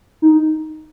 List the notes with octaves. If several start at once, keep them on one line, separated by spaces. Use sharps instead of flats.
D#4